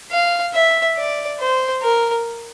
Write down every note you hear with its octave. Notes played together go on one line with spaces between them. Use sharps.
F5
E5
D5
C5
A#4